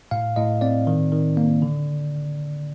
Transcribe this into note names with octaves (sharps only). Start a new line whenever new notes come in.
A2 F5
A2 D#5
C4 D5
D#3
D#3
A#3
D3